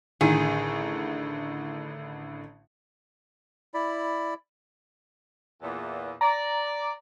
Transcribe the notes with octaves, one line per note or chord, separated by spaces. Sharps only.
A1 A2 D3 D#3 G#4
E4 D5 B5
E2 A#2
D5 A#5